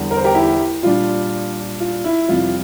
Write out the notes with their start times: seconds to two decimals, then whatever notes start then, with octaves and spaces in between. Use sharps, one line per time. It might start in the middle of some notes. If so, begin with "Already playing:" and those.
Already playing: E2 D3 G3
0.11 A#4
0.17 C5
0.24 G4 A#4
0.34 E4 G4
0.83 A#2 G3 D4 F4
1.80 F4
2.04 E4
2.28 F2 C3 G3 F4